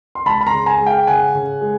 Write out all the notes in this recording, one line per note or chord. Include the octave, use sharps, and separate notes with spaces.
C6
C#2 A5 B5
B5
A#5 C6
C#3
G#5 A#5
G#3
F5 G5
C#3 F#5 G#5
C#3
G#3